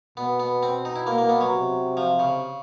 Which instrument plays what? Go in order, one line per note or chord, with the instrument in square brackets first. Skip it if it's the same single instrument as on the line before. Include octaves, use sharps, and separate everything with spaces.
[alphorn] B2 [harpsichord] B3
[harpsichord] B3
C4
D#4
E4
A#3
A#3
B3
F#3
[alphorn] C3
[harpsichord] F3
C#3